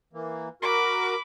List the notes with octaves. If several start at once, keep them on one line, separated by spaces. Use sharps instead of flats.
E3 A#3
F#4 A#4 B5 D6